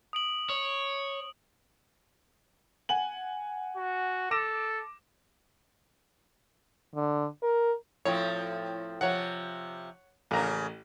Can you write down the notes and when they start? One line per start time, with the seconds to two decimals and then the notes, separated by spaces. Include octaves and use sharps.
0.13 D#6 D7 F#7
0.50 C#5
2.89 F#5 G#5 F#7
3.77 F#4
4.31 A4 D6 A#6 E7
6.95 D3
7.42 A#4
8.05 A2 F3 C4 C#5
9.01 C3 F3 C#5 F#5
10.31 A1 C#3 A#3 A#5